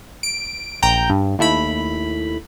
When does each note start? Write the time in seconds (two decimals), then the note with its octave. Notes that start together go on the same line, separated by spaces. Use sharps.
0.23 D7
0.82 A#1 G5 A#5 G6
1.10 G2
1.39 D#2 A3 E4 B5